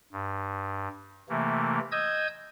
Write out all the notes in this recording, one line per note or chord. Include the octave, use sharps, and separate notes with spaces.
G2
C3 E3 A3 A#3
D#5 D#6 E6 G6 G#6